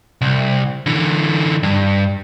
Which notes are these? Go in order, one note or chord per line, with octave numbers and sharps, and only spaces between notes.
C2
D3 E3
G2